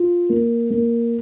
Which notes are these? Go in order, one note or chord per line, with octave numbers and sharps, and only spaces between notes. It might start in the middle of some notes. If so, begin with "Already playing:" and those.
Already playing: F4
A#3
A#3